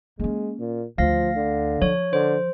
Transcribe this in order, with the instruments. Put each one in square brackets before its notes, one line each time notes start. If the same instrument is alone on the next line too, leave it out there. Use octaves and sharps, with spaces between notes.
[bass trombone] G#3 [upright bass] A#3 C#4
[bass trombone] A#2
[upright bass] D2 [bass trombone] F3 [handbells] F5 A#6
[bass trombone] D3
[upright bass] F3 [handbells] C#5
[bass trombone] D3 [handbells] C5